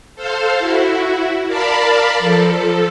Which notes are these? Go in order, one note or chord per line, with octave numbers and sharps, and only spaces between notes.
A4 C5 F5
E4 F#4
A#4 D5 F5 A5 B5
F3 A4